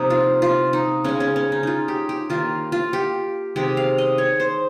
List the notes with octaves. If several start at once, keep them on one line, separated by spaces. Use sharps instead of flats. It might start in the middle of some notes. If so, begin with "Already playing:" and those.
Already playing: C3 F3 A#3 D#4
F4
F4
D#4
C#3 G#3 C#4
C#4
C#4
D#4
D#4 F4
G4
G4
D#3 A#3 F4
F4
G4
C3 D#3 G#3 G4
F5
D#5
C#5
C5